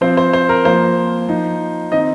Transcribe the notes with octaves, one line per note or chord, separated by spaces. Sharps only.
F3 C4 F4 C5
C5
C5
A#4
F3 A#3 F4 C5
F3 D#4
D#3 C4 D#4 D#5